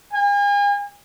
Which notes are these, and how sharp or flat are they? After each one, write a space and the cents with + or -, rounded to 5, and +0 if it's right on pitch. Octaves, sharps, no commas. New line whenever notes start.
G#5 -40